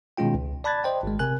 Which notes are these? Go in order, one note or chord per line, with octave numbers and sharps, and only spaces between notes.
B2 D#3 G#3 C#4 F4 G5
C#2
D5 A5 B5 F#6 G#6 A6
C5 D5 D#5 G5
G#1 G#3
C3 A#4 G#5 F#6